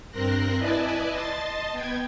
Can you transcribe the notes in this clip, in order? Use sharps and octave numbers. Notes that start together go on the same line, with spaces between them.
G2 C4 A#4 C6 F#6 A#6
E4 B4 D5 D#5 G#5 A5
D#5 A5 C6 A6
B3 G5 G#6